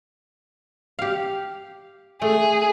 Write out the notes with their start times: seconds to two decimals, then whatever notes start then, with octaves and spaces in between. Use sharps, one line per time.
0.99 G4 F5
2.22 A3 G#4